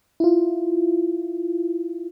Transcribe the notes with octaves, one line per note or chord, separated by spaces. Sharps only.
E4 F4